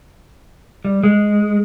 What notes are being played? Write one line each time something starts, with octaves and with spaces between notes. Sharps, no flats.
G3
G#3